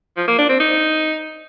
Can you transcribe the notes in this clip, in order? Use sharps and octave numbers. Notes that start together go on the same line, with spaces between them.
F3
A#3
D4
C4
D#4